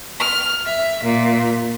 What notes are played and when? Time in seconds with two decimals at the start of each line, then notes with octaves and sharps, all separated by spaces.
0.19 F6
0.64 E5
1.03 A#2